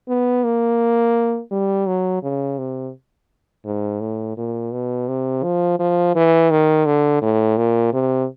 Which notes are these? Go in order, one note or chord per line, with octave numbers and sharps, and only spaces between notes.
B3
A#3
G3
F#3
C#3
C3
G#2
A2
A#2
B2
C3
F3
F3
E3
D#3
D3
A2
A#2
C3